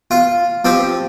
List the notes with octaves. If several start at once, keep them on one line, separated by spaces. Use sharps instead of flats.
F4 F5
F3 C4 G4